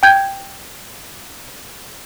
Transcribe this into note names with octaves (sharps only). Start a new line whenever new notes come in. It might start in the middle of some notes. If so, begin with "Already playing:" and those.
G5 G6 G#6